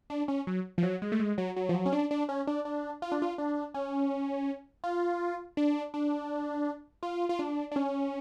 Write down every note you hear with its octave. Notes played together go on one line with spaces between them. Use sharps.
D4
C#4
F#3
F3
F#3
G#3
A3
G#3
F#3
F#3
F3
F#3
C#4
D4
D4
C#4
D4
D4
F4
D4
F4
D4
C#4
F4
D4
D4
F4
F4
D4
D4
C#4